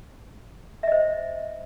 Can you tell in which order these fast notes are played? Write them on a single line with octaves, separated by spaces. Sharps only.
E5 D#5 C5